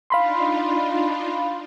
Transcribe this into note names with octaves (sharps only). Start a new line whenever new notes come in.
D4 D#4 F4 F5 B5 C6